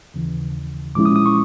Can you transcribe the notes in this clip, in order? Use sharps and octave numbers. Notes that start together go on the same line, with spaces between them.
D#2 C#3 E3
A#2 F3 G#3 C#4 E4 D6
D#6
D#6
C#6